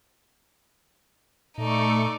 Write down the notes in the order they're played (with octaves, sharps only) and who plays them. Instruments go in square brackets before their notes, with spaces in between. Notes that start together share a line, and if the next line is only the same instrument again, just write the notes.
[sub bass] A#2 [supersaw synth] A3 C#6 [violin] D#4 D5